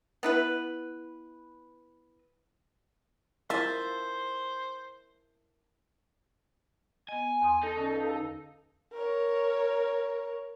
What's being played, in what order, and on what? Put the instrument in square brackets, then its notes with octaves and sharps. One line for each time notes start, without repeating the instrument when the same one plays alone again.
[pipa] B3 E4 B4
[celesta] E4 A#4 [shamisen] F4 [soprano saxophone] C5 [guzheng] E5 A5
[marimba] B3 D#5 [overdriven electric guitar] G#5
[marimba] E2 C6 D#6
[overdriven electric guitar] D#4 [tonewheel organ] A4
[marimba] D3 C#4
B4 F5
F5 E6
[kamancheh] A#4 C#5